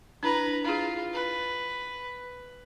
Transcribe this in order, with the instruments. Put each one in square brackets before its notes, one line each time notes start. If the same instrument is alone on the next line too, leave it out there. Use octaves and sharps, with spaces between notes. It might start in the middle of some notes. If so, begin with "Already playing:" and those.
[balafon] D4 E4 [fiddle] B4 A#5
[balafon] E4 G#4 [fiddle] F4
[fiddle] B4